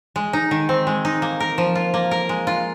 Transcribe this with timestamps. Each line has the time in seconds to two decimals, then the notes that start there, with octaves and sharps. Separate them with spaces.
0.16 G#3
0.33 D#4
0.51 D#3
0.69 C4
0.87 G#3
1.05 D#4
1.22 A#3
1.40 A#4
1.58 F3
1.75 F4
1.94 A#3
2.11 A#4
2.29 G#3
2.47 F4